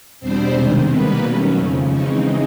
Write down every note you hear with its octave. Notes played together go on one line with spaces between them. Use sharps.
E2 B2 G3 B3 C4 D4 C5
C3 D#3 G#3
B2 G3 A#3 B3 B4
D#3 F#3 A3 C#4
F2 C#3 F3
C#3 E3 G#3 C4 C#4 D#4 C#5